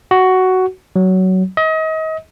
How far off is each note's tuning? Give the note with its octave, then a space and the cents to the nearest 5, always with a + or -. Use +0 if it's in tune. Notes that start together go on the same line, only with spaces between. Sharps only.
F#4 +10
F#3 +15
D#5 +35